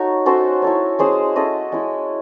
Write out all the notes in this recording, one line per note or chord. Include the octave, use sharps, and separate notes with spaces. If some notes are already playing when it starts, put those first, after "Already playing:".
Already playing: D#4 F#4 A4 C#5
C#4 F#4 A4 C5
E4 A4 C#5
G#3 C#4 G#4 C5
C#4 E4 A4 D#5
G#3 C#4 E4